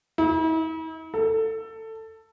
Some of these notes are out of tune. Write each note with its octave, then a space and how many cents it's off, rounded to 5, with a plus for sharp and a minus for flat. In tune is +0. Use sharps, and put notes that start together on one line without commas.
E4 -45
A4 +15